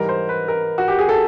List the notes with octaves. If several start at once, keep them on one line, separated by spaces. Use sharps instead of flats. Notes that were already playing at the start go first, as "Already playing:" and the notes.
Already playing: G#2 E3 G3 A#4
C5
B4
A#4
F#4
G4
G#4
A4